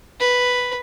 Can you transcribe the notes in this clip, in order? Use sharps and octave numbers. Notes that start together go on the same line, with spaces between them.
B4